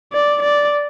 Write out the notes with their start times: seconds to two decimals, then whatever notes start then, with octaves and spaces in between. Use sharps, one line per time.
0.13 D5
0.43 D5